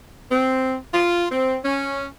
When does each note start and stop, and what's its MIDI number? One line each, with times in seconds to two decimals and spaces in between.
0.31 0.75 60
0.93 1.25 65
1.31 1.56 60
1.64 2.06 61